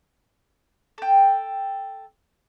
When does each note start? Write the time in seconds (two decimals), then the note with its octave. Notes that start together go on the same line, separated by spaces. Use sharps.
0.98 A4 G5